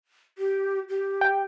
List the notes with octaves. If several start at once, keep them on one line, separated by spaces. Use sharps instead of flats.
G4
G4
G5